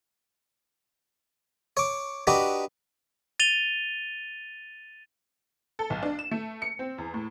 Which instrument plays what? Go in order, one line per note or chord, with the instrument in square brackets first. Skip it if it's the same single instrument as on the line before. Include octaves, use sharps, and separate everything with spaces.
[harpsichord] C#5 D6
D4 D#4 F#4 G4 B4
[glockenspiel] A6 D#7 F7 G7
[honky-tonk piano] A4
B1
D4
E7
A3
C#7
C4
E2
A2